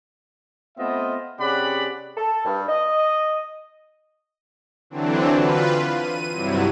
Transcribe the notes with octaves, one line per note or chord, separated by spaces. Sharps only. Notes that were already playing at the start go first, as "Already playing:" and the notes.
A3 B3 C4 F4 D#5 E5
C3 C#4 G#4 D5 F#5 B5
A4
G2
D#5
D3 E3 F#3 C4 D4
F4 B4
D#7
G2 C3 F#3 G3 E4